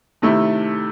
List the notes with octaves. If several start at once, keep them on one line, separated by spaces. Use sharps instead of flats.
C3 D#3 A3 E4